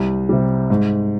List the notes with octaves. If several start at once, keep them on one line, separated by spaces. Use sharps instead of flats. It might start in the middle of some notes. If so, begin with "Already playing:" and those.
Already playing: C2
C3 G3
G#2